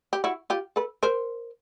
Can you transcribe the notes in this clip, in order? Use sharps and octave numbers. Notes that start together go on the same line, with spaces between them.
G4
E4 F#4
F4 G4
A4 B4
A#4 C5